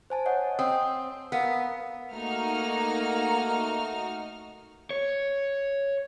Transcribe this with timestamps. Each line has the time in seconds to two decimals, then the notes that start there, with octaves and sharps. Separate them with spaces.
0.10 C5 G#5 A5
0.26 C#5 D#5 F#5
0.59 C4 D#6
1.32 B3 A#4 F5 F#5
2.13 A3 A#3 D#4 F#4 F6
4.90 C#5